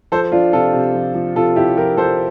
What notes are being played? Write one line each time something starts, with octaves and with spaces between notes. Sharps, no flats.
F3 A4 C5
F3 D4 F4
C3 F4 A4
C3
F3
F3
C3 F4 A4
C3 E4 G4
F3 G4 A#4
F3 A4 C5